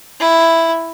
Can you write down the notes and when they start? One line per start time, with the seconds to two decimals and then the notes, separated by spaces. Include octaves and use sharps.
0.20 E4